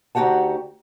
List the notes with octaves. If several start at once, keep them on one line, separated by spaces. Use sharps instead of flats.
D2 D#4 F#4 G4 F#5 A5